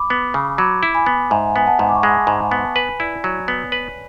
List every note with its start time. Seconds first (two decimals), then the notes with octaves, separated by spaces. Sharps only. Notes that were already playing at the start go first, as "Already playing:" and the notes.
Already playing: B5 D6
0.10 B3
0.34 C#3
0.58 F#3 B5 D6
0.83 E4
0.94 G#5 B5
1.06 B3
1.30 G#2 E5 G#5
1.56 B3 G#5
1.67 F#5 A5
1.79 G#2
1.89 D6
1.95 C#6
2.03 G#3 G#5 B5
2.27 G#2
2.51 B3
2.65 A5
2.75 B4 G#5 B5
3.00 E4 D5
3.24 F#3 C#5
3.48 B3
3.72 B4